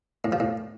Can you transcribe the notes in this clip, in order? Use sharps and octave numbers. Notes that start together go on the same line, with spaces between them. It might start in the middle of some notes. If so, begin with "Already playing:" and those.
A2
F3
A2